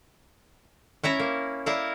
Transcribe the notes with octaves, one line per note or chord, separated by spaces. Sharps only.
C#4 E4 E5 A#5
A#3
E4 A#4 D5 F5